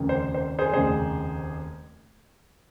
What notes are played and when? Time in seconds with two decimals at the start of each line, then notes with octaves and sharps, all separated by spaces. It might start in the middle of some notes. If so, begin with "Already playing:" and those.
Already playing: F1 D#2 C#3
0.09 C5
0.34 C5
0.59 G#4 C5
0.73 F1 D#2 C#3 G#4 C5